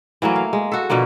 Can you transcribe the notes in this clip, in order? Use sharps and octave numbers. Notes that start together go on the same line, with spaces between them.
E3 F#3 A3 A#3
F5
G#3
F#4 A4
B2 D3 F3 A#3